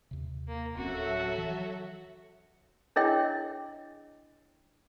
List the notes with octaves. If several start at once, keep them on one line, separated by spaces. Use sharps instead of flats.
D#2 C3
A#3
D1 F#3 C4 C#4 F#4 A4 E5
E3
D4 E4 G#4 C#5 D#5 G5